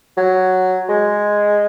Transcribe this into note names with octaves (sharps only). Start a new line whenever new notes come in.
F#3
G#3